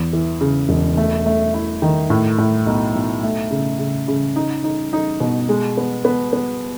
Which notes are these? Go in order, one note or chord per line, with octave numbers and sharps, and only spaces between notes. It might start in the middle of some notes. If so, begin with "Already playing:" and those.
Already playing: E2
E3
C#3
E1
A3
A3
E4
D#3
A2
A2
B1
B1
A3
C#3
C#3
C#3
D#4
D#4
D#4
B2
G#3
B3
B3
B3